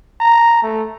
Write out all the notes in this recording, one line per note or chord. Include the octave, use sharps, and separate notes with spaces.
A#5
A3